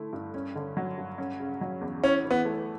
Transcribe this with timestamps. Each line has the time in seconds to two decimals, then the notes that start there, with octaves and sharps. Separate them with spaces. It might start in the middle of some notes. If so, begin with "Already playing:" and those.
Already playing: D3 A3 E4
0.13 G2
0.34 C#4
0.55 D3
0.77 F#3
0.97 G2
1.18 C#4
1.40 C#3
1.61 F#3
1.81 E2
2.03 C#4 E4
2.24 E3
2.30 B3
2.45 A3